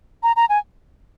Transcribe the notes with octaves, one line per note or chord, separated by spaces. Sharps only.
A#5
A#5
G#5